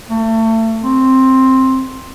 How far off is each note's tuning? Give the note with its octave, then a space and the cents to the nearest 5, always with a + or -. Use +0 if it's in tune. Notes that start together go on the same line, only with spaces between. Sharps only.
A3 +30
C4 +5